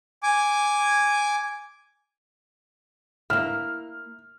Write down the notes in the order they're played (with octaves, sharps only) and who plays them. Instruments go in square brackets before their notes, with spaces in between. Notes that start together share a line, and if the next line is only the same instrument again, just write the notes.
[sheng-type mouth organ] G#5 D6
[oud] A#3 E4 [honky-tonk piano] F6